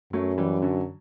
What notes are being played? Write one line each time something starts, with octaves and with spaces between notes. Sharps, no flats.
F#2 F#3 A3
E3 G3
D3 F#3